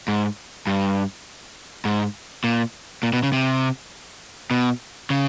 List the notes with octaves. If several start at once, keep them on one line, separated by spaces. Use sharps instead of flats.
G#2
G2
G#2
A#2
A#2
B2
C#3
C3
B2
C#3